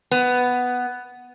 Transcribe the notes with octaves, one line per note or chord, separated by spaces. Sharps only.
B3